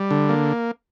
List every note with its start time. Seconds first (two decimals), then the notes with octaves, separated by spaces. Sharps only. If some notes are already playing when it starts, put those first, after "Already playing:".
Already playing: G3
0.11 D3
0.29 A#3